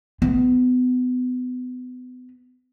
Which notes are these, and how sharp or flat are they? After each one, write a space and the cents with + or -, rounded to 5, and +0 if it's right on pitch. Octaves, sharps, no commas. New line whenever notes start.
B3 +30